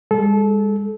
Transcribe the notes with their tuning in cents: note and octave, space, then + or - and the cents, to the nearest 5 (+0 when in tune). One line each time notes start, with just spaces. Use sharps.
G#3 -40 A4 -25